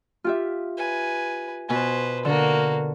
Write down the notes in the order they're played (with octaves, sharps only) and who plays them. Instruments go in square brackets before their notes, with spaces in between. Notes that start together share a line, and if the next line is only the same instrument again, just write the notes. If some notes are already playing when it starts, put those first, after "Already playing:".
[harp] F4 G4 E5
[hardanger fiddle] B4 G#5
[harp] B2 G#5 [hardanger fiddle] B4 C5
[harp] D3 [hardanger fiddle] A#3 F#4